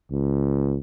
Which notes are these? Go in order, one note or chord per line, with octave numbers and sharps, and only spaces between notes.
C#2